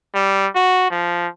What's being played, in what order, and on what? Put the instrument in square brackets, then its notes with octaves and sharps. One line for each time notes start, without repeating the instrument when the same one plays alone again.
[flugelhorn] G3
F#4
F3